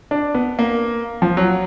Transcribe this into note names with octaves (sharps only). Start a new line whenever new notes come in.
D4
B3
A#3
F3
F#3